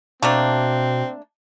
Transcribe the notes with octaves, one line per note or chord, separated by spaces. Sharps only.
B2 A3 A#3 C4 D4